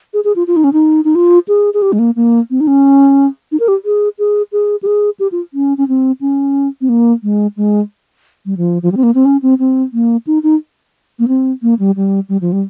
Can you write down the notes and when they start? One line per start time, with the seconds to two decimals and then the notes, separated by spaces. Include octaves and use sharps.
0.14 G#4
0.24 G#4
0.36 F4
0.47 F4
0.56 D#4
0.64 C#4
0.73 D#4
1.05 D#4
1.15 F4
1.48 G#4
1.74 G#4
1.82 G4
1.93 G#3
1.99 A#3
2.16 A#3
2.50 C4
2.60 D#4
2.67 C#4
3.52 D#4
3.60 A#4
3.68 G4
3.85 G#4
4.19 G#4
4.52 G#4
4.83 G4
4.86 G#4
5.20 G4
5.32 F4
5.54 C#4
5.78 C#4
5.88 C4
6.21 C#4
6.81 C4
6.89 A#3
7.23 G#3
7.57 G#3
8.46 G3
8.57 F3
8.82 F3
8.92 G3
8.97 C4
9.03 A#3
9.15 C4
9.25 C#4
9.42 C4
9.59 C4
9.93 A#3
10.27 D#4
10.43 D#4
11.19 A#3
11.28 C4
11.62 A#3
11.79 G3
11.96 G3
12.29 G3
12.41 F3
12.52 G3